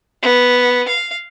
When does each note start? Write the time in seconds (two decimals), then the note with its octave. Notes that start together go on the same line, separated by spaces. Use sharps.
0.22 B3
0.88 F5